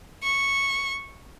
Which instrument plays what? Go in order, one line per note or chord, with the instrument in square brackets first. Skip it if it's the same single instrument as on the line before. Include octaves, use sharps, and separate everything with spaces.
[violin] C#6